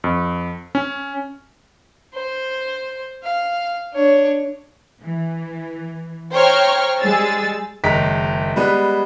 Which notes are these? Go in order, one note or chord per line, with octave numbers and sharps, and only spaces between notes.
F2
C#4
C5
F5
D4 C#5
E3
C5 C#5 G5 A#5 C#6 F6
G3 G#3 G#4 E6 A6
F#1 D#3 G#3 A#5 B6
G3 G#3 B3